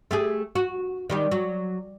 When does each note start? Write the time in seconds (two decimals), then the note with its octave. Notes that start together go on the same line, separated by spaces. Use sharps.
0.11 A3 G4 G#4
0.55 F#4
1.10 D#3 G3 G4
1.31 F#3